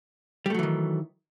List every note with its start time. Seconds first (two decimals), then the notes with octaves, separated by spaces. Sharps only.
0.46 G3
0.50 A3
0.54 F#3
0.59 E3
0.63 D#3